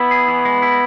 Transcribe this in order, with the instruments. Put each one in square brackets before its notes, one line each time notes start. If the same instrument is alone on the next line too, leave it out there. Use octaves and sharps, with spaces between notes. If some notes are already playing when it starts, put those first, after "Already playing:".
Already playing: [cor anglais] B3 [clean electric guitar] E4
[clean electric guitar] G#4
E3
G#3
E4